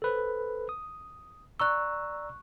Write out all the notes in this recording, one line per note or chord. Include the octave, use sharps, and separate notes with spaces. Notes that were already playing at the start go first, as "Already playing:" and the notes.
A4 B4 C5
D#6
D5 A#5 C#6 E6 F#6